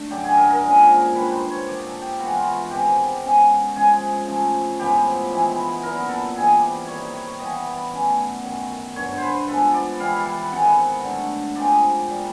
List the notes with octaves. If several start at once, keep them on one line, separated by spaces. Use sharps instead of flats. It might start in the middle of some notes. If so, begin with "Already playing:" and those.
Already playing: A3 D4
F#2 D3 F#3 G4
G#4
A#4
A#4
A#2 F3 G#3 C#4
D#3 G3 A#3 D4 B4
C5
C#5
F3 A#3 D#4 D5
A4
G4
E3 G#3 B3 E4 F#4
F4
F#4
G#2 D#3 G#3 C4 G4
B2 G#3 C#4
F3 G#3 C#4 G#4
C#3 F3 A3
A2 F3 G#3 B3 G4
E3 G#3 B3 E4
A#2 F#3 B3 E4 A#4
A4
C3 E3 G3 G#4
D5
C3 D#3 G3 A#3 C#5
C#5
E3 G3 B3 D#5
D5
B2 F#3 A3 C#4
F#2 D#3 F#3
G2 D3 F#3 C#5
B4 C5
F3 G#3 B3 A4
D5
E3 G3 B3 E4 F5
F#5
C3 D#3 G#3 B3 F#5
D3 F#3 A3
F3 G#3 C4 D#4 D5
A#2 G3 A#3